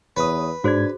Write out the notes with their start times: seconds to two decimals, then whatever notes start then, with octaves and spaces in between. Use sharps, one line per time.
0.17 E2 B4 C#5 D#6
0.64 G#2 D4 F#4 G#4 C5 G#6